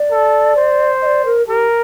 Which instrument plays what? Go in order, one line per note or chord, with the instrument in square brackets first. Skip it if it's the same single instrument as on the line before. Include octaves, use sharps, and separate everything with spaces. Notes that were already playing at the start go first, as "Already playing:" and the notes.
Already playing: [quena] D5
[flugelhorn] A4
C5
[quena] D#5
D5
A#4
[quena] G4 [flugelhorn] A#4